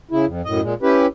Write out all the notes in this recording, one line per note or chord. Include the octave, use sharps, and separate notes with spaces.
C#3 E4
F2
F#2 A2 D#5
A#2 G#3
C#4 E4 G4 B4